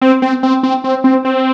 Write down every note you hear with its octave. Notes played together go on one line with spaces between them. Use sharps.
C4
C4
C4
C4
C4
C4
C4